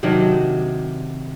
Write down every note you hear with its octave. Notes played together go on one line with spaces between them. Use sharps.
C3 D#3 F#3 D4